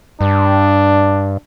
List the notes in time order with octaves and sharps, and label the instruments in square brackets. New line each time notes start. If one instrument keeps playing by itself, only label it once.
[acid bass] G2 [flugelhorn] D4